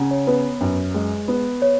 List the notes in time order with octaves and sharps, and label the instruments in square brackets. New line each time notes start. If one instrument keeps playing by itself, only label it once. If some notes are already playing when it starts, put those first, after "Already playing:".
Already playing: [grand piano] C#3 [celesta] F#5 A#5
[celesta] C#5
[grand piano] B3 [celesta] B4
[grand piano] F#2
G#3
B3
[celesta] C#5